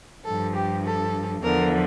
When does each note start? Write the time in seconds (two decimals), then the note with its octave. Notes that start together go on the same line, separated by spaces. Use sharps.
0.25 G2 F3 A4
0.54 G4
0.83 A4
1.42 E2 D3 F3 A#4